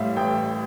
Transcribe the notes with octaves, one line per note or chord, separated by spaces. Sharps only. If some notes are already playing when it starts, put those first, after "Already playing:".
Already playing: A1 A2 G3 E5 F5
A1 G5